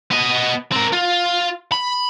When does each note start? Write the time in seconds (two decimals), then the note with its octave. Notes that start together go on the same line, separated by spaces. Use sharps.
0.11 B3 D#5
0.72 C4 A#4
0.93 F4
1.72 B5